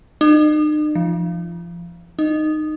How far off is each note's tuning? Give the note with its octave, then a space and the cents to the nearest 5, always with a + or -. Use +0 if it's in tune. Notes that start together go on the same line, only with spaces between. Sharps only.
D#4 -45
F3 -30
D#4 -15